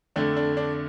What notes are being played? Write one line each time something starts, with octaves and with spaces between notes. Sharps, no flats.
F2 D3 A3 D4
D4
D4